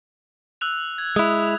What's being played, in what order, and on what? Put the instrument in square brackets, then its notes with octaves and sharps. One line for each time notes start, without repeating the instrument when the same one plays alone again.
[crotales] E6 F#6 F7
G#6
[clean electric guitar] G#3 E4 [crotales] D#6